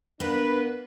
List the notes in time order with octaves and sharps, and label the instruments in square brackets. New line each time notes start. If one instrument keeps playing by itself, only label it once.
[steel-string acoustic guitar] A#3 B3 [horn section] D4 B4